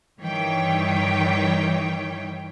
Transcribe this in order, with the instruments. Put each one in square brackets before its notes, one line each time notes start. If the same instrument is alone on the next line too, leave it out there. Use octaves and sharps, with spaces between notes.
[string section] G2 D#3 E3 C#5 G5